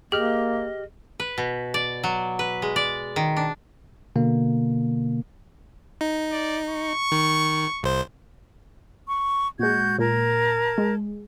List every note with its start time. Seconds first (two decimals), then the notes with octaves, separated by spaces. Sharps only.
0.12 A#3 G4 G#4 D#5 F6
1.20 B4
1.38 B2
1.74 D5
2.04 F#3
2.39 B4
2.62 G#3
2.76 D5
3.16 D#3
3.37 D4
4.16 B2 D3 A#3
6.01 D#4
6.32 D5
6.69 C#6
7.12 D#3
7.83 C2 C5
9.07 C#6
9.59 A#2 G#3 F#4 G6 G#6
9.99 A#2 A#4 A5 G#6
10.78 G#3